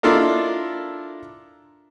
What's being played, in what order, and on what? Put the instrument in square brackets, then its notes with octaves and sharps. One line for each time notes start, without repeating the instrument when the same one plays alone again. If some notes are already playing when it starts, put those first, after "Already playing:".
[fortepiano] D4 E4 F4 A4 A#4 D#5